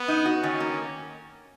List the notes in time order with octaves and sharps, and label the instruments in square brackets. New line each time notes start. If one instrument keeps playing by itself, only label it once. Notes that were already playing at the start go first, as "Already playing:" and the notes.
Already playing: [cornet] B3
[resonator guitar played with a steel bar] D#4
F#4
[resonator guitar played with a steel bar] D#3 [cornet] C#4
[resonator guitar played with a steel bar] A#3